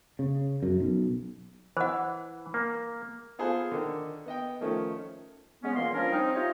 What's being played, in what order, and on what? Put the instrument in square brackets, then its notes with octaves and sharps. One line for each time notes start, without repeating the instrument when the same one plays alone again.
[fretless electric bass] C#3
F#2
B1
[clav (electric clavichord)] E3 [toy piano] C5 F#5
[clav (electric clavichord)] A#3
[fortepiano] B3 F4 G#4 A4 B4 C5
D3 D#3
B3 D#5 G5
D#3 F3 A3 C#4
[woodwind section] G#3 B3 C#4
A#2 E3 A#3 C6
F3 G3 C#4 D4 A#4 C#5
C4 D#4
F4 G4 C5 C#5 D#5 E5